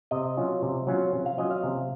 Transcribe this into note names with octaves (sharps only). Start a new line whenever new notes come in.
C3 D#5
F#3 C#4 F4
C3
F#3 C#4 F4
C3
F5
F#3 C#4 F4 D#5
F5
C3